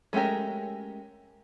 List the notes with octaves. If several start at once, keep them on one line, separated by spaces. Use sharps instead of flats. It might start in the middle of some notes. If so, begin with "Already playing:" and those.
G#3 A3 C#4 G4 A#4